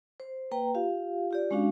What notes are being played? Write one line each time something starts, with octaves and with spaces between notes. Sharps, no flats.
C5
A#3 B4 G5 A#5
F4 G4 F5
F4 G4 D5
G#3 C#4 D4 F#4 F5